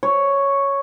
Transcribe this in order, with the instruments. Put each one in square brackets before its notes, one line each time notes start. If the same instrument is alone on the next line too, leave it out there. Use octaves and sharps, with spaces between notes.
[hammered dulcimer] C#5